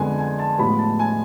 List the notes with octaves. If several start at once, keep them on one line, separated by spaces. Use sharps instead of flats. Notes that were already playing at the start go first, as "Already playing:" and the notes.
Already playing: F2 D3 G#3 B3 G#5
G#5
A5
A1 A2 F3 G#3 B3 B5
A5
G#5